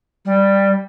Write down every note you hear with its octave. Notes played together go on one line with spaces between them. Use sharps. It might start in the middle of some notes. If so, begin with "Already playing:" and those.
G3